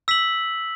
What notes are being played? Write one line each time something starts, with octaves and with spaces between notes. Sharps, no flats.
E6 B6 F#7